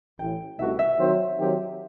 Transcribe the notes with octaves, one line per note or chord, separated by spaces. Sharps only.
A1 A2 E3 G5
C2 B2 A3 D#4 F#4 E5
E5
D#3 F#3 C4 F#4 C5
D#3 F#3 C4 D#4 G4